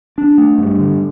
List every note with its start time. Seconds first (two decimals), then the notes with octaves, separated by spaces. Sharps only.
0.18 D4
0.38 A3
0.58 G2
0.79 D3